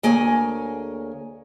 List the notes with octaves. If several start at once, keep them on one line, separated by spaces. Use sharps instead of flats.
D2 A#3 G#4 C#5 G#5